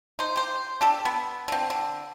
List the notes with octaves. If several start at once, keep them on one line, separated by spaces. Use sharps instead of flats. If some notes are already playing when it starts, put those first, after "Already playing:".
D#4 C5
G4 C5
D4 G4 A4
B3
D3 C4
D3